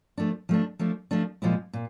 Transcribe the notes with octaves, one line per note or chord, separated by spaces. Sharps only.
F3 A3 D4
F3 A3 D4
F3 A3 D4
F3 A3 D4
A#2 F3 G#3 C4 E4
A#2